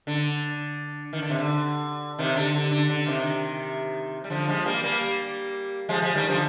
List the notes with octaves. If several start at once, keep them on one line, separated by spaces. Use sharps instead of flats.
D3
D#3
D3
C3
D3
C3 D#3
D3
D3
D3
D3
C3 D#3
G3
D3 F3
F3 G#3
G3 A#3
G3 A#3
F3 G#3
F3 G#3
D#3 G3
D3 F3